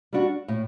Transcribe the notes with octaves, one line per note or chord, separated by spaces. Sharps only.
G3 D4 F#4
A2